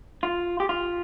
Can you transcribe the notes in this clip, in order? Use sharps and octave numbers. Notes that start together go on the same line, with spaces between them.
F4
G4
F4